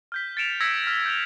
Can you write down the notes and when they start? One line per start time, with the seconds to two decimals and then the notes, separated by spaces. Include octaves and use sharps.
0.12 F6 G6 B6
0.37 A6 C#7 D7 E7 F7
0.60 E6 G#6 A#6 B6 C#7
0.87 F6
1.06 G6 A#6 F7